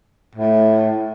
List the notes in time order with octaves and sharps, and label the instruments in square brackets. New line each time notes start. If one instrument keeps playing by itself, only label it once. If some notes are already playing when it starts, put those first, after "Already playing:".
[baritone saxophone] A2